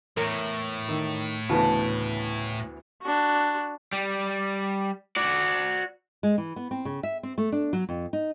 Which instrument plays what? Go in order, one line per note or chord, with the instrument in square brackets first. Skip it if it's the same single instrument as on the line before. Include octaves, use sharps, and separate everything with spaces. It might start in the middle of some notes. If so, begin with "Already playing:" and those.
[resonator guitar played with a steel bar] E2 A#4 C#5 [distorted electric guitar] A2
[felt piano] D#3
[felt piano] D2 E3 B3 [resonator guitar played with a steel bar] C#3 A5
[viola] D4 F#4
[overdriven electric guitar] G3
F#4 D5
[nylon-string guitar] G#3
E3
B3
C4
C#3
E5
C4
A3
D4
F#3
F2
D#4